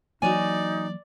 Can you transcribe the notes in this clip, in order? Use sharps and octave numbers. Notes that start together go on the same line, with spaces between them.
E3 F#3 A#3 D#4 F#4 C#5 D5 G#5